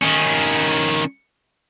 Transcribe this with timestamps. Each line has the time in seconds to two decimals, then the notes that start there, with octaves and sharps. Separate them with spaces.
0.03 D#3 C#4